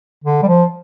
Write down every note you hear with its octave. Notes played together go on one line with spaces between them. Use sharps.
D3
G3
F3